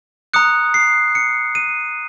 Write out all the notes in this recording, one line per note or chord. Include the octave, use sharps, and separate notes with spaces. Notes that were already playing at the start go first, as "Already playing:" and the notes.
A#5 D#6 F#6 C#7
C7
C#7
D#7